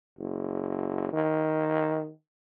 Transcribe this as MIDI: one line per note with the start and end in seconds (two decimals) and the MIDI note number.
0.18 1.09 30
1.13 2.11 51